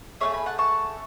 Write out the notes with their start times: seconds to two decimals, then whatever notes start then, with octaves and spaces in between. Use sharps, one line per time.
0.21 A3 C#4 G#4 C#5 E5
0.33 G#5 B5
0.46 F#5 A5
0.58 A5 C#6